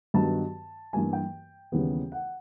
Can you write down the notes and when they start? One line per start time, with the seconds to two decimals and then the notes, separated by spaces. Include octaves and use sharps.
0.14 G2 D#3 F#3 B3 A5
0.93 G2 E3 G3 A#3 G#5
1.13 G5
1.72 D#2 C#3 E3 G3 B3
2.12 F#5